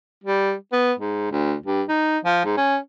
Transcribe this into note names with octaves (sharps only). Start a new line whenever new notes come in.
G3
B3
G#2
D2
G2
D#4
F3
G#2
C#4